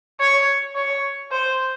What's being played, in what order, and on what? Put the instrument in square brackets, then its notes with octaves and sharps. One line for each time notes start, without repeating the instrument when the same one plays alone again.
[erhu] C#5
C#5
C5